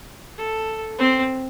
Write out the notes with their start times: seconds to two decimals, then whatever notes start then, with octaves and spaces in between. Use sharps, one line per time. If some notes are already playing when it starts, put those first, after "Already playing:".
0.38 A4
0.99 C4